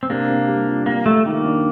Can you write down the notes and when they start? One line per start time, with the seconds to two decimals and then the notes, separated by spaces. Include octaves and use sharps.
0.03 C4
0.10 C3 A#3 D4
0.29 C3
0.48 G3
0.68 F4
0.86 G3 A#3
1.06 G3 A3
1.25 D#3 A#3
1.45 D4